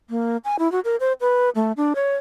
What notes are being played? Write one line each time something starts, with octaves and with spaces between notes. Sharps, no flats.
A#3
G#5
E4
F#4
A#4
C5
B4
A3
D4
C#5